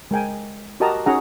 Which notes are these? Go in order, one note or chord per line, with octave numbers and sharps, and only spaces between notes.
G#3 A#4 G5 G#5
F#4 G4 A#4 D#5 A5 A#5
C#4 D#4 F#4 G#4 F#5 A#5